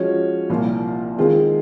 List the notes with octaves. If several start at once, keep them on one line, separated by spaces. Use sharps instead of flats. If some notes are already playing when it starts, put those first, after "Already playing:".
Already playing: F3 G#3 C#4 F#4 C#5
C2 A#2 F3 A#3 F4
D#3 G#3 C4 F4 G#4